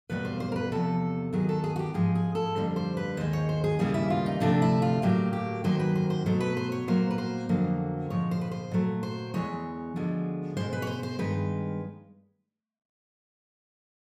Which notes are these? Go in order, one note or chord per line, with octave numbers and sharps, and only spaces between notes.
E2 B2 G3 A#3 B4
C5
C5
A#4
B4
E2 C3 F3 A4
D#2 D#3 F#3 G#4
A4
G#4
F#4
G4
G#2 F3 G#3 G#4
G#4
A4
F2 D3 G3 A#3 C5
C5
B4
D#2 D#3 G#3 C5
C#5
C5
G#4
D#2 C#3 E3 G3 A#3 G#4
E4
F4
D#4
D2 C3 F3 A3 D4
E4
F4
A2 F#3 A#3 G4
G4
F#2 D#3 F#3 A#3 C5
B4
C5
C5
B2 F#3 A3 C5
B4
C5
C#5
A#2 F#3 A#3 C5
B4
C5
F2 D3 F#3 A#3
A#2 F3 G#3 C#5
C5
B4
C5
A#2 F#3 A3
C5
E2 C#3 E3 G#3 C#5
D2 D3 F3 G#3
B2 G#3 C5
B4
C#5
C5
C5
G2 D#3 G#3 B4